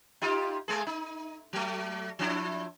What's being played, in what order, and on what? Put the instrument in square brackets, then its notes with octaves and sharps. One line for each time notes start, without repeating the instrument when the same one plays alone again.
[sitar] D#4 F4 G4
G#3 A3 G#4
D#4
F#3 A3
F3 D4 E4